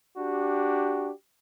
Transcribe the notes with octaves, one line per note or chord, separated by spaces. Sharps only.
D4 F#4 G4